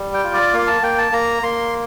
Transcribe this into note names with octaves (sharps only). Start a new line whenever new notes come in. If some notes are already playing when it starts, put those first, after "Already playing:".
Already playing: G3
G5
F4
D5
A#3 F5
A5
A#3 G5
A5
A#3 A#5
A#3 C6